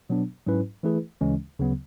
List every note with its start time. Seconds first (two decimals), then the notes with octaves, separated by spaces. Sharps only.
0.09 B2 F#3 B3 D4
0.46 G#2 F#3 C#4 E4 B4
0.83 E3 A3 E4 G#4 B4
1.21 D2 C#3 E3 G#3 C#4
1.59 D2 C#3 F#3 B3